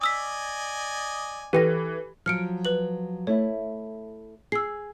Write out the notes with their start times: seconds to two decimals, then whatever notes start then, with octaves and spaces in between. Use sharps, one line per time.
0.01 D5 D#5 G#5 D#6 E6 B6
1.53 E3 G4 A4 B4 G5 A#6
2.26 F3 F#3 F6 C#7 D7
2.65 B4 F#7
3.27 A3 E4 C#5
4.52 G#4 E6 C7